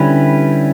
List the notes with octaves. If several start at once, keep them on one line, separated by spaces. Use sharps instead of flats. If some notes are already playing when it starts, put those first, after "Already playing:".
Already playing: D3 G3 C#4 E4 B4